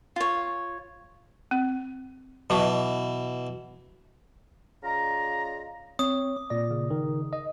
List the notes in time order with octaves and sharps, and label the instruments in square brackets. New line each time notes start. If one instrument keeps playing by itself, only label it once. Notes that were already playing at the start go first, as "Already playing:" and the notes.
[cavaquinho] F4 C#5
[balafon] C4
[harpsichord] B2 E3 [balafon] F#3 A5 C#6
[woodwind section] C#3 F4 D5 D#5 A#5
[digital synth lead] C4 [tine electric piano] C#5 [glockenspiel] D#6
[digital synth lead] D6
[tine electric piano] A#2 D5 [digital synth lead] A#6
[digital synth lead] C#3
[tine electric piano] D#3
D#5